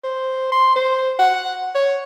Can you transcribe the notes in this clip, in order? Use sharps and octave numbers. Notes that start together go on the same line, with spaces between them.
C5
C6
C5
F#5
C#5